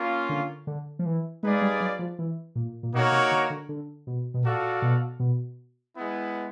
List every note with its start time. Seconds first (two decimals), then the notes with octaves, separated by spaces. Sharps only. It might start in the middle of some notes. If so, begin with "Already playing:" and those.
Already playing: A#3 C#4 F4
0.29 D3
0.67 D3
0.99 F3
1.06 E3
1.43 G#3 D#4 G#4 B4 D5 F5
1.62 G3
1.80 F#3
1.99 F3
2.19 E3
2.56 A#2
2.83 A#2
2.93 B2 A#3 D#4 F#4 A#4 C#5
3.12 C3
3.31 D3
3.50 D3
3.69 D3
4.07 B2
4.34 B2
4.44 A#2 F#4 A4 D5 F5
4.82 B2
5.20 B2
5.95 G#3 B3 E4